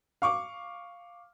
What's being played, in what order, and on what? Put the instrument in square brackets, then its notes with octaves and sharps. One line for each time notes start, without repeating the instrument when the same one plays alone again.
[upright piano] F5 C#6 D6